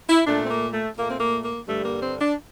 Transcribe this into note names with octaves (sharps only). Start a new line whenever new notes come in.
E4
A#2 A3 D4
C4
A#3
A3
A#2 A3 A#3
C4
A#3
A#3
G2 D3 G3 A3
A#3
C4
D4